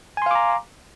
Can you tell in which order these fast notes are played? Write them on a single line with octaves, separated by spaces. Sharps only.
G#5 C6 F5 D6 A#5